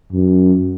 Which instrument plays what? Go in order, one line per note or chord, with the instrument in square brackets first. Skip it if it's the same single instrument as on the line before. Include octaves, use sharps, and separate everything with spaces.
[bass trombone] F#2